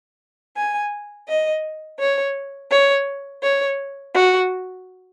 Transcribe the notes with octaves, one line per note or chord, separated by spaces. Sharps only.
G#5
D#5
C#5
C#5
C#5
F#4